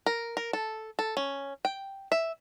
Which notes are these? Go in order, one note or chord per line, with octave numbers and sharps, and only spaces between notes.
A#4
A#4
A4
A4
C#4
G5
E5